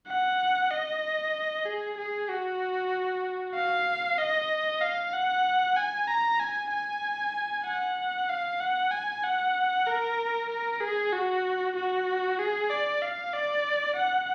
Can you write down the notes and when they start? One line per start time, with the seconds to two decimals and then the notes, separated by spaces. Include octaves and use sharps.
0.08 F#5
0.71 D#5
1.66 G#4
1.98 G#4
2.29 F#4
3.55 F5
4.18 D#5
4.81 F5
5.13 F#5
5.76 G#5
6.08 A#5
6.40 G#5
6.71 G#5
7.65 F#5
8.29 F5
8.60 F#5
8.91 G#5
9.24 F#5
9.86 A#4
10.50 A#4
10.81 G#4
11.13 F#4
11.76 F#4
12.39 G#4
12.70 D5
13.02 F5
13.33 D5
13.96 F#5